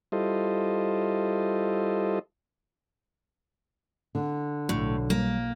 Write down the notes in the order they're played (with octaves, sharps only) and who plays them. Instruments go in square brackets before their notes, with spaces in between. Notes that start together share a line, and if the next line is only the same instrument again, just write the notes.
[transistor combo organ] G3 E4 F4 A4 C5 D#5
[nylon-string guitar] D3
[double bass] B1 [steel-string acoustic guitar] A2
[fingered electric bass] G3 [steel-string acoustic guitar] A#3